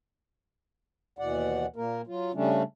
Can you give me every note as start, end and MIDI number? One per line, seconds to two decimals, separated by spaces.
1.19 1.66 39
1.19 1.66 47
1.19 1.66 52
1.19 1.66 74
1.19 1.66 78
1.76 2.02 46
1.76 2.02 58
1.76 2.02 70
2.07 2.32 54
2.07 2.32 65
2.34 2.63 49
2.34 2.63 55
2.34 2.63 57
2.34 2.63 61
2.34 2.63 62